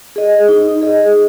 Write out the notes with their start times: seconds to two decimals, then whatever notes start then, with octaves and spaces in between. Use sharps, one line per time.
0.16 G#4 D#5
0.48 D#4
0.82 G#4 D#5